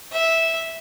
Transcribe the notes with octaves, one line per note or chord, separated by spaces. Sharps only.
E5